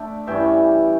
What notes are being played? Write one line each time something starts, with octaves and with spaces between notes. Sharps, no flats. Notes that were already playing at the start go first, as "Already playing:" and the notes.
Already playing: D3 A3 D4 E5 G5
G2 E3 G3 C#4 E5 G5